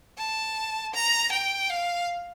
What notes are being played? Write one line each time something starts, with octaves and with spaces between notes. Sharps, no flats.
A5
A#5
G5
F5